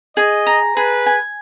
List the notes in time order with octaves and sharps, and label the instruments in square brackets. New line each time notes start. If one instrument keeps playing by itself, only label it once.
[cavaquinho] G#4 [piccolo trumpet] D#5
[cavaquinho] A#5
[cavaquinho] G#4 [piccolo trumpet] B4
[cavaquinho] G#5